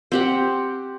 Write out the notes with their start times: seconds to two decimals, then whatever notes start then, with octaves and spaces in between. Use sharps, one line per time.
0.12 C4 G4 F#5